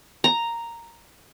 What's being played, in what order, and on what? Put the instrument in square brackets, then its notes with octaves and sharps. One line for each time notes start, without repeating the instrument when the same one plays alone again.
[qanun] A#5